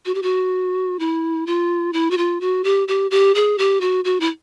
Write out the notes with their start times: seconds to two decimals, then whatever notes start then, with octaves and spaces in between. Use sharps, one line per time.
0.06 F#4
0.14 G4
0.22 F#4
0.99 E4
1.47 F4
1.93 E4
2.10 F#4
2.17 F4
2.41 F#4
2.64 G4
2.88 G4
3.11 G4
3.35 G#4
3.58 G4
3.81 F#4
4.04 F#4
4.20 E4